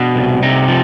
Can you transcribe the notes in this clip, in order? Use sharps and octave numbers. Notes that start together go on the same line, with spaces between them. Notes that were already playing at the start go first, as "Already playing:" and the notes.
Already playing: B2 D4
C2
C3 D#4
F3